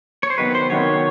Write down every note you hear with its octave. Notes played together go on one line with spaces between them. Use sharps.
C#5
C5
C3 D#3 F#3 B3 B4
C5
C3 D#3 F#3 B3 C#5